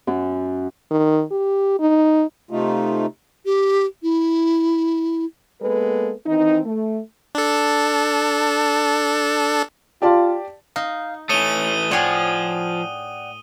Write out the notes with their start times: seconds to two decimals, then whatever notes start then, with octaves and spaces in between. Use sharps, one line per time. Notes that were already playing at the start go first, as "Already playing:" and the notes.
0.07 F#2
0.91 D#3
1.31 G4
1.79 D#4
2.51 C3 A3 D#4 F4
3.45 G4
4.03 E4
5.62 G#3 A#3 B3 A4 B4
6.26 D#3 E3 C4 D#4
6.65 A3
7.35 D4 A4
10.02 F4 G4 D5 A5
10.76 D#4 F5
11.29 E3 A3 C#5 D#6 C#7 D#7 G7
11.91 A2 F3 G#4 C#5 D5 F#5 G5